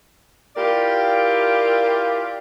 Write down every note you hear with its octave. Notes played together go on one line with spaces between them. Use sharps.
E4 F4 G4 A#4 D5